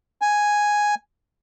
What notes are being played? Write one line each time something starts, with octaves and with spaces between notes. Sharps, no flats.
G#5